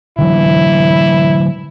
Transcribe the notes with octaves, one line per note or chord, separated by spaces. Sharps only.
D3 E3 F#3 E4